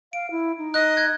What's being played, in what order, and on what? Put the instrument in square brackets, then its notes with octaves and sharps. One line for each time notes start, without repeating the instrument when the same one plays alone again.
[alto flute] F5 [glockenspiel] D7
[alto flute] E4
D#4
[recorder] D#5 [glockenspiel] F#6
[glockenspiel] F#6 G#6